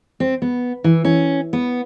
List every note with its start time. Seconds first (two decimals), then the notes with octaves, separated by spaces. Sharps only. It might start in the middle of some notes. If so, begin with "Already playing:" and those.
0.20 C4
0.42 B3
0.84 E3
1.04 C#4
1.53 B3